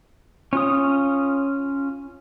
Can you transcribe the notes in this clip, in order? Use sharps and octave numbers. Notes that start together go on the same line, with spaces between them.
C#4 F4 D#6